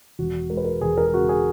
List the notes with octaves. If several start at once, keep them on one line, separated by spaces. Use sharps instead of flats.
E1 F#4
G#3 A#4
B4
A#4
E1 G#4
A#4
G#4
C#3 F#4
G#4